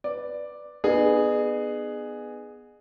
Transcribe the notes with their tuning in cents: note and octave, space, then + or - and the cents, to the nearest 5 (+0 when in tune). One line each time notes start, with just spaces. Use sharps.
B4 +0 D5 +0
B3 +0 D#4 -45 G#4 +0